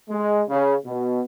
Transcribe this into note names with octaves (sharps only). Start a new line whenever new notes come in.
G#3
C#3
B2